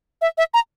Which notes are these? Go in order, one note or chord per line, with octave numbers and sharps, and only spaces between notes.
E5
E5
A#5